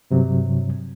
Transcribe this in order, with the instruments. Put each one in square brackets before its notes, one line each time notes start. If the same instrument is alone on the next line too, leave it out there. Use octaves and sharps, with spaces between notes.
[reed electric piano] G2 C3 F#3